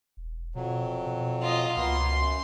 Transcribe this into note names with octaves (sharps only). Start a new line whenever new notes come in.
E1
F2 B2 F#3
B2
F4 D#5
C#2 A#3 B3 F4 C6
F#2